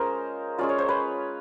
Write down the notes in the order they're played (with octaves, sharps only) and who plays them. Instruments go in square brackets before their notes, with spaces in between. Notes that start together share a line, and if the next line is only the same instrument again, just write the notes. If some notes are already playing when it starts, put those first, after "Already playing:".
Already playing: [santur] G#3 C#4 F4 A#4 C5
G#3 C#4 F4 D5
C#5
C5
B4 C#5